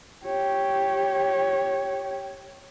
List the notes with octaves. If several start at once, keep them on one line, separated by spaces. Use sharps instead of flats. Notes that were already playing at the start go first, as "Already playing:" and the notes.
G4 C#5